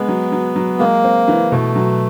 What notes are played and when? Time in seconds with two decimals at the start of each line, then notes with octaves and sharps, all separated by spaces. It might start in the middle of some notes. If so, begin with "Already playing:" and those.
Already playing: G#3 B3
0.08 F#3
0.32 F#3
0.56 F#3
0.79 G#3 A#3
1.04 C4
1.28 E3
1.52 B2 A3
1.76 F#3